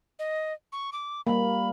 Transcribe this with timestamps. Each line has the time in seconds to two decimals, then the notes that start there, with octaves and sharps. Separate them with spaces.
0.19 D#5
0.72 C#6
0.92 D6
1.27 G3 A#3 B5